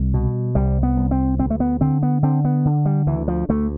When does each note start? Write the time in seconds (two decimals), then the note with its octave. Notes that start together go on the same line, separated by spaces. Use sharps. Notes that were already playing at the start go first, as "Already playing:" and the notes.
Already playing: C2 G3
0.14 B2
0.55 C2 G3
0.83 B3
0.97 C2
1.11 C4
1.39 D2 C4
1.50 A3
1.60 B3
1.81 D3 C4
2.03 B3
2.22 D3 C4
2.45 B3
2.65 D3
2.85 G3
3.07 D2 E3
3.28 F3
3.49 D2 A3